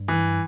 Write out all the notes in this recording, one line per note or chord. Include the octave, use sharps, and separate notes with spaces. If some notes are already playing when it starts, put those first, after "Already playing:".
Already playing: G2
E3